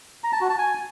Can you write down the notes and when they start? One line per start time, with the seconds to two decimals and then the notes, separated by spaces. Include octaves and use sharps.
0.24 A#5
0.32 A5
0.41 F#4
0.50 A5
0.58 G#5